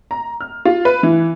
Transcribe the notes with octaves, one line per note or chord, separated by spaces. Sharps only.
A#5
F6
F4
B4
E3